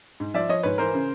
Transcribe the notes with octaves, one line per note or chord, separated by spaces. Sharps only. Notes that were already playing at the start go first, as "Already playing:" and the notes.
G#2
F3 D5 E5
F3 C#5 D#5
G#2 B4 C#5
E3 A#4 C5
C#3